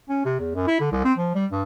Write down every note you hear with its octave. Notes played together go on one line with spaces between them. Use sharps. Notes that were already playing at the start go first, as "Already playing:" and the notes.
C#4
C3
E2
F#2
E4
D3
C2
C4
F3
G3
G2